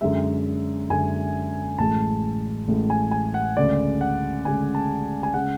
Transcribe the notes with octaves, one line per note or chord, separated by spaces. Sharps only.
F#2 D3 G#3 E5
F#2 D3 G#3 G#5
A1 A2 G#3 A5
A1 A2 G#3
G#5
G#5
F#5
D2 C#3 G#3 D5
F#5
D2 C#3 G#3 G#5
A5
G#5
C#3 G#3 F#5